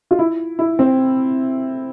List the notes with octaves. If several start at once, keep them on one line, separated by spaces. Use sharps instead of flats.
F4
E4
E4
C4